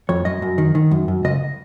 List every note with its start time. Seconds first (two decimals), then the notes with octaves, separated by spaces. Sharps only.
0.09 F2 C#5
0.25 F#2 D#5
0.42 F#2
0.58 D#3
0.75 D#3
0.91 F#2
1.08 F#2
1.25 C#2 D#5